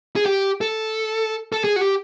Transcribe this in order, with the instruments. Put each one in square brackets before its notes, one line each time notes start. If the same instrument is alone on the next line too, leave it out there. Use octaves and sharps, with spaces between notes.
[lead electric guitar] G#4
G4
A4
A4
G#4
F#4
G4